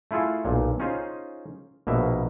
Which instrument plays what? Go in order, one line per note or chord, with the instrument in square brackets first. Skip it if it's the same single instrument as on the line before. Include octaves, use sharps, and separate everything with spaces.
[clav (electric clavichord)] A3 E4 F4 G#4 A4
B1 A#2
C#4 D#4 F4 G#4 C5
A#1 B2 A#3 E5